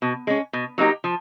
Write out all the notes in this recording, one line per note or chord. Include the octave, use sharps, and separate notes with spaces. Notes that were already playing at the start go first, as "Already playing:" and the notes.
B2
G#3 C#4
B2
F#3 A#3 D#4 G4
F3